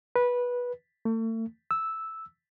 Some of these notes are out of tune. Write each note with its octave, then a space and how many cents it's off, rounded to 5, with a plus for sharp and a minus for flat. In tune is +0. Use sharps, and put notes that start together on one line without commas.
B4 -15
A3 +40
E6 -5